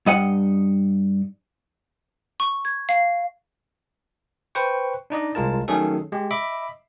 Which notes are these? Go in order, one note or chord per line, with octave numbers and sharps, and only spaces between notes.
G2 D#5 F#5
C#6
G#6
F5
B4 C5 G5 C#6
D4 D#4 D5 D#5
C2 G#3 F4 A#4 A5
D#3 F#3 A3 C#4 G#4 A4
G#3 G4
D#5 E5 B5 D6